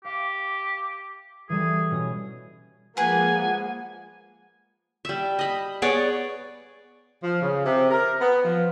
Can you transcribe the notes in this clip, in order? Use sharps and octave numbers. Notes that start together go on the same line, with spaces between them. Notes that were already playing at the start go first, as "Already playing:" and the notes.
G4 F5
E3 G3 G#4 A4
B2 C#4 D#6
F3 G#3 A#3 G#4 B4 F#5 G#5
G3 E5
D#5 B5
B3 G#4 C#5 D5
F3
C#3
C3
A#4
B3
F3